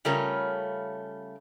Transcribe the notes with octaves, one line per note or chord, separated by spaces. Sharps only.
C#3 G3 A3 C#4 F4 A#4